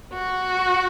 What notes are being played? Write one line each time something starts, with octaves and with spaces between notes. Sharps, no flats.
F#4